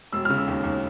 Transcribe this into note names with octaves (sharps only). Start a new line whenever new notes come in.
E1 E6
C#3 F6
E6
D#2
D#2